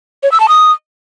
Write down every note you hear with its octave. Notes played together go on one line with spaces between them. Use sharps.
C#5
E6
A5
D#6